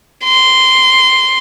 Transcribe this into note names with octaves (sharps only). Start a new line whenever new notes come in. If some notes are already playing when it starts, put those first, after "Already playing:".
C6